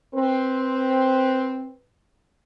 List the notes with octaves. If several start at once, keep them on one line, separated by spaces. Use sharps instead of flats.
C4 B4